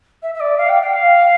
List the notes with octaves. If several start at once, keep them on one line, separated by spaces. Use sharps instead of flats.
E5
E5
D5
F5
G5
G5
F5